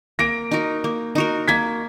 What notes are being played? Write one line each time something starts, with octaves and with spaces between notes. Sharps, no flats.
A#3 A#6 D7
D#4 F#4 A#4
A#3
D#4 F#4 A#4
A#3 G#6 B6